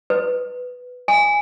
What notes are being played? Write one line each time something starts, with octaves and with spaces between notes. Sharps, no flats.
B4
G#5